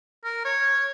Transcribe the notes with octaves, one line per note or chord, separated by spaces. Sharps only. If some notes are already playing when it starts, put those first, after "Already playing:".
A#4
C#5